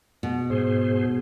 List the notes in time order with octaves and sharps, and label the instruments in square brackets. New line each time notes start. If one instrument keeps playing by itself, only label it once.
[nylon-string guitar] B2
[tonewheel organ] G#2 G#4 C5